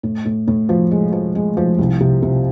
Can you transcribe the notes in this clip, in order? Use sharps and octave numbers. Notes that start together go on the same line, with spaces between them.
A2
A2
A2
F3
G#3
F3
G#3
F3
C2
C3
C3